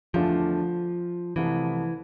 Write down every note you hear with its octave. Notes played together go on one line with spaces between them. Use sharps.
E2 D3 F3 A3 D4 F4
C2 C3 E3 F3 A3